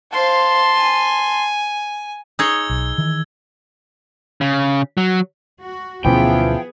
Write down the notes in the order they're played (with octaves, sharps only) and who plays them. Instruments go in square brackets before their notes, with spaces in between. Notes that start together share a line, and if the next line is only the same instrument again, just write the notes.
[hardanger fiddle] C5 F5 [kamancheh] A5 C6
[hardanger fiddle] G#5
[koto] D#4 G#4 C#5 [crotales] E6 G#6 G7
[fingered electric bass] B1
D#3 E3
[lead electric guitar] C#3
F#3
[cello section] F#4
[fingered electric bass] D2 B2 C#4 [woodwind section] E3 F3 [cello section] B3 G#4 [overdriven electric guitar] G5